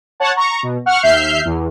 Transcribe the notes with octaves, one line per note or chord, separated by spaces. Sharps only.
C#5 F#5 A5
A#5 C#6
B2
F#5 C#6 F6
D#2 E5 F6 G6 C7
E2